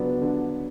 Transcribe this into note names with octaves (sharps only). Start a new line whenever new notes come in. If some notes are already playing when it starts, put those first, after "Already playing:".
Already playing: D3 F#3 B3 D4
D3